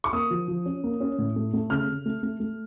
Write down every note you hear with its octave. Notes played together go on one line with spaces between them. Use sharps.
C#6
A#3 D#6
F3
F3
C#4
A#3
C#4
A2
A3
A3
C#3 F6
C#3
A3
A3
A3